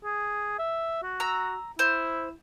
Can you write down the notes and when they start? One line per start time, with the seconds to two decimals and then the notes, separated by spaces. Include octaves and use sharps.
0.05 G#4
0.59 E5
1.03 F#4
1.20 A#5 E6
1.79 E4 C5